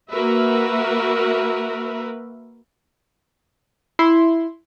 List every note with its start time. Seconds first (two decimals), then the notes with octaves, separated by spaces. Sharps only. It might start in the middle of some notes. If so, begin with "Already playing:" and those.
0.12 A#3 F#4 A#4 B4 E5
3.99 E4 C6